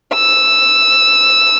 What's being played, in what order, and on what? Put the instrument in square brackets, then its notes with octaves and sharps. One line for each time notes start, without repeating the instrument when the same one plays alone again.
[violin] E6